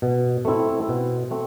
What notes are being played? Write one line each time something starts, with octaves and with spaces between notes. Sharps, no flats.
B2
A3 C4 E4 A4
B2
A3 C4